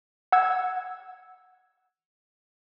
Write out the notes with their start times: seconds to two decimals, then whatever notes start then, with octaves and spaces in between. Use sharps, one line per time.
0.32 F#5 E6 G#6